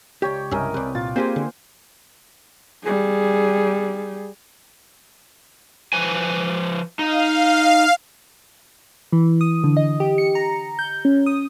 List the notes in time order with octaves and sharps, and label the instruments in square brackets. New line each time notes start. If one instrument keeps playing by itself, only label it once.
[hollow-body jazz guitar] C#2 G4 [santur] C#5 D5 G5
[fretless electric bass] C2 G2 [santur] C#4 A#4 D#5 [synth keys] E5
[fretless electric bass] C2 C3 [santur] B4 D5
[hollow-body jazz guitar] A#2 [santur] F4 [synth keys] A6
[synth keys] A#3 C5 G#5 [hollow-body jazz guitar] C4 G4 G#4
[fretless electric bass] D3
[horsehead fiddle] G3 G#4
[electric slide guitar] F3 B4 G#5
[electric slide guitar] D#4 [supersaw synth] F5
[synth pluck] E3
D#6
D3
D#5
G4
C#7
A#5
G6
C#4
D#6